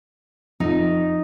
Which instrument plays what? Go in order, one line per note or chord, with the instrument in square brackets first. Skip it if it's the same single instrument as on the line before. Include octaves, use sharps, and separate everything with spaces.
[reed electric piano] F2 [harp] D#4